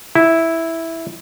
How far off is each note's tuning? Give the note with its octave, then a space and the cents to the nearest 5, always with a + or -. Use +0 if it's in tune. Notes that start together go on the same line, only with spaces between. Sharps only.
E4 -5